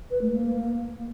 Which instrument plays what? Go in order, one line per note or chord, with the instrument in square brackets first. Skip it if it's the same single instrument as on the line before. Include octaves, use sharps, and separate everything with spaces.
[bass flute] B4
A3
A#3